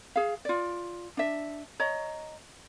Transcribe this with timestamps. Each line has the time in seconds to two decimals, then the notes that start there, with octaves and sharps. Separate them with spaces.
0.16 G#4 F5
0.45 F4 D5
1.17 D4 E5
1.80 C#5 D#5 A#5